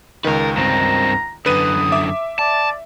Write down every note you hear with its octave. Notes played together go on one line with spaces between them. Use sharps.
C#2 D#3 A#4 B4
G2 C4 A#5
F#2 D3 B4 D#6 D#7
E5 D6
D5 A5